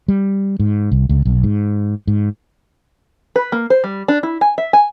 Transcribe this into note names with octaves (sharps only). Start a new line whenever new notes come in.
G3
G#2
C2
C#2
B1
G#2
G#2
B4
A#3
C5
G3
D4
E4
G#5
E5
G#5